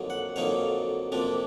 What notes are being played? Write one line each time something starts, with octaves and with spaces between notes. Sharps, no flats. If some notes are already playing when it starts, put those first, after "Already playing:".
Already playing: F2 D3 F#3 A#3 D#4
F#5
F2 D3 F#3 A#3 D#4 F5
F2 C3 F3 A#3 D4